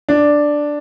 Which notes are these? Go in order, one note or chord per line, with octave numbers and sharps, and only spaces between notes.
D4